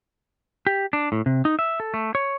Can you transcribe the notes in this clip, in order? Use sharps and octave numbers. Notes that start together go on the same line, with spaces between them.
G4
D4
A2
C3
D#4
E5
A4
A3
C#5